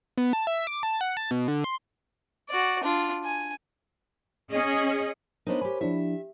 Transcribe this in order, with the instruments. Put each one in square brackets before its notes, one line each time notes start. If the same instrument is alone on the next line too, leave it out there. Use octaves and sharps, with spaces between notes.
[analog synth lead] B3
A5
E5
D6
A5
F#5
A5
B2
D3
C6
[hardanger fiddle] F#4 D5
D4 F4
G#5
[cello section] C#4 G#4 D#5
[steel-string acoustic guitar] B3 D4 D#4 [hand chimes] A#4 C5 C#5
[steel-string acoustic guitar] G4 G#5 [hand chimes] B5
[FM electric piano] F3 D4 E4 [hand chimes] G4 [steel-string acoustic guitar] E5